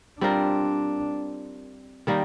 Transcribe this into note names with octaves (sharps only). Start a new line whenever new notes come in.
G3 C4 D4 F4 A#4
D#3 G3 A#3